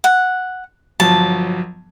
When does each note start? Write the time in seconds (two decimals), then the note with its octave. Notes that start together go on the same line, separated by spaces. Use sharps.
0.04 F#5
1.00 G1 F3 F#3 A5